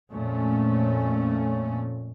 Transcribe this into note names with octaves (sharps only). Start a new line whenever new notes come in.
F2 A#2 A3 C#4